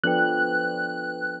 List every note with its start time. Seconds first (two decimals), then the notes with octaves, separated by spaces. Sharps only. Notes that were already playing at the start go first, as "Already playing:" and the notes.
0.04 F3 B3 D4 A4 B4 G5 F#6